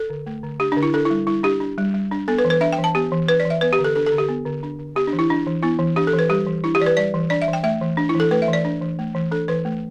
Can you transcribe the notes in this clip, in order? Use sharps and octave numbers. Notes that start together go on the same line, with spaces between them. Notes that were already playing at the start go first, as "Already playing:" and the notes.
Already playing: A4
D3
A3
D3
D4 G4
D3 D4
E4
D4 A4
E4
G3
G3 E4
D4 G4
D4
G3
G3
D4
B3 A4
B4
E3
B4
D4 E5
G5
E3
A5
B3 G4
E3
D4 B4
D5
E3
E5
B3 B4
G4
D3
A4
D4 A4
A4
D3
G4
B3
D3
D4
D3
B3 G4
D4
E3
E4
D4
E3
B3 E4
E3
D4 G4
A4
E3
B4
G3 G4
E3
D4 E4
G4
E3 D5
B4
G3 D5
E3
D4 D5
E5
E3
G5
A3 E5
E3
D4
E4
E3 A4
A3 B4
E5
E3
D5
D4
E3
A3
E3
D4 A4
E3 B4
A3